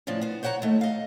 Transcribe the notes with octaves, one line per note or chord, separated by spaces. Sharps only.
A2 C#3 F3 D4
B3 C5
C5 C#5 F#5 G5 A#5
D#2 A3
D#5 F5